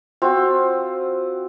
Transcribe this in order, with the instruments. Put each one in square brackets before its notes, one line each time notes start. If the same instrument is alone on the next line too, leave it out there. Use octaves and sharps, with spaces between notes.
[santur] C4 F4 F#4